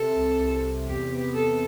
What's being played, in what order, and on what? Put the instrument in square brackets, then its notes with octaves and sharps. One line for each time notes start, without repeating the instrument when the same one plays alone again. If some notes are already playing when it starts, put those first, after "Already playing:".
Already playing: [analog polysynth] C3 [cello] A4
[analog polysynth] C2
C2
C3
[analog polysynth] E2 [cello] G4
[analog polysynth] B3
[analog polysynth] B3 [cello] A4